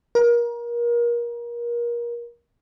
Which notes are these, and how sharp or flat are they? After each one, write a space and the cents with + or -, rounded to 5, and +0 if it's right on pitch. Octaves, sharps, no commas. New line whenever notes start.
A#4 +30